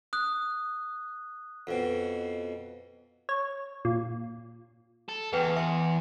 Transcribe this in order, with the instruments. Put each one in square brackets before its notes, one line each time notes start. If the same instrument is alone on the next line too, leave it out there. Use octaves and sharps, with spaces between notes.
[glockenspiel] D#6 F#6
[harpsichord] F2 B2
[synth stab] C#5
A#2
[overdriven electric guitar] A4
[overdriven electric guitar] E2 [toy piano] G#4 B4 G5
[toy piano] E5 A5 C6